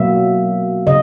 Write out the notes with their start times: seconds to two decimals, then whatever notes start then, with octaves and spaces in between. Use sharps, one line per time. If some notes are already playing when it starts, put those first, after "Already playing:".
Already playing: B2 F#3 A#3 E5
0.87 C#3 D#5